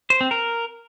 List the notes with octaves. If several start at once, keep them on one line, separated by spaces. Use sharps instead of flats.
C5
C4
A#4